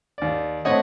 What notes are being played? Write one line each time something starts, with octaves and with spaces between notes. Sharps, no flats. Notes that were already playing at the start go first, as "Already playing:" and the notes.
D#2 D5
A2 C4 C#5 D#5 F#5